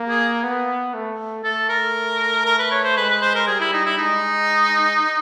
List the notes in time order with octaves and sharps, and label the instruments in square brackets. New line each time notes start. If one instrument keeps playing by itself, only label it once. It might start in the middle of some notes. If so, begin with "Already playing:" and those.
Already playing: [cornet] A#3
[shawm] G#4
[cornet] B3
A3
[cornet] A3 [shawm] A4
[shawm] A#4
A#4
B4
C#5
C5
[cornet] G#3 [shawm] B4
[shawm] B4
C5
A#4
[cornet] G3 [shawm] G#4
[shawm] E4
D#4
E4
[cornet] G#3 [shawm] D#4